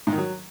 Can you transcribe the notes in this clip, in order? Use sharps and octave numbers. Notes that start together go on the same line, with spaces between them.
G#2
D#3
F#3